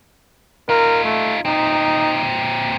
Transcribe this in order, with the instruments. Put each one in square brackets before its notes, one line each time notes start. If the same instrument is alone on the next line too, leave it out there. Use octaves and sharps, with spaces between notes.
[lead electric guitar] D#4 F4 [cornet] A#4
[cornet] A3
[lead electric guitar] A#2 C4 [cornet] D#4